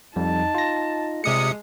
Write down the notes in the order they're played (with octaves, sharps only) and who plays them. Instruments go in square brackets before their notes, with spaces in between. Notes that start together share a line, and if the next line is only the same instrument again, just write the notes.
[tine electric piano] F2 G3 [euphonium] D#4 [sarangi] A5
[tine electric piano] F4 A#6
[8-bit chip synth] C3 D#6 C#7 [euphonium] G3 [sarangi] G#3